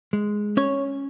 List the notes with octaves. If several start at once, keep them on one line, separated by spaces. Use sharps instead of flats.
G#3
C#4 C#5